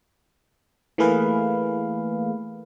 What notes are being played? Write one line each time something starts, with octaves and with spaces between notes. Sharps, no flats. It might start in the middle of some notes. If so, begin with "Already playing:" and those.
E3 A3 A#3 G#4 B4 F5